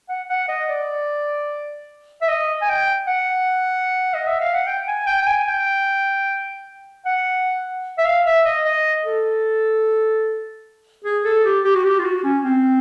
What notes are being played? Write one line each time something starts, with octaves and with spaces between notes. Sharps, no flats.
F#5
F#5
D#5
D5
E5
D#5
G#5
G5
F#5
D#5
E5
F5
F#5
G5
G#5
G5
G5
G#5
G5
F#5
E5
F5
E5
D#5
D#5
A4
G#4
A4
G4
G4
F#4
G4
F4
F#4
C#4
C4